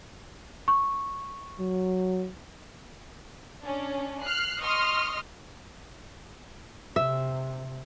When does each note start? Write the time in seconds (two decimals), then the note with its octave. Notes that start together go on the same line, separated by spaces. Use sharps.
0.68 C#6
1.59 F#3
3.63 C#4 D4
4.22 F6 F#6 C7
4.61 D#5 C6 C#6 D#6 F6
6.96 C3 E5